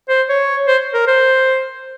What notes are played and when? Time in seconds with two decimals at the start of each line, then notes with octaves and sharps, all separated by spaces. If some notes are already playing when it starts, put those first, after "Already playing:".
0.09 C5
0.29 C#5
0.68 C5
0.94 A#4
1.08 C5